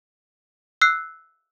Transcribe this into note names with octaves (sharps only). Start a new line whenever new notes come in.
E6 F#6 C7